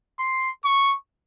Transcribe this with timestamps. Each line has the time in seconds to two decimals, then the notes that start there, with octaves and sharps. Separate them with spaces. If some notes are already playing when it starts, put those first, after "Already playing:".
0.20 C6
0.65 C#6